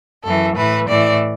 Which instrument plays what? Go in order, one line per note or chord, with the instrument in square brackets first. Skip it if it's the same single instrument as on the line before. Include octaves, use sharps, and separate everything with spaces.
[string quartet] F#2 E3 A4
A2 E3 B4
A2 E3 D5